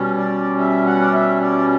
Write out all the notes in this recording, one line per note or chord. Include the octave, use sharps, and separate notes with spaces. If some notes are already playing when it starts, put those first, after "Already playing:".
Already playing: B2 G3 C#4
D5
E5
F#5
D5
E5
D5